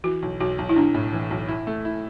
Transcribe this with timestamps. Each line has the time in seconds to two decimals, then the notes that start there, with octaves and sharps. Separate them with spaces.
0.04 E3 F#4
0.22 B1
0.40 B1 F#4
0.58 B1
0.69 E4
0.76 B1 D4
0.94 A2
1.13 E3
1.30 B1
1.48 E4
1.67 A3
1.85 E4